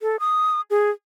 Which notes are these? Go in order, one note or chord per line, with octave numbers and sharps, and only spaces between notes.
A4
D#6
G#4